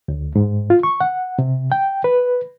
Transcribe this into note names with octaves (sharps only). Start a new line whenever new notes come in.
D2
G#2
F4
C#6
F#5
C3
G5
B4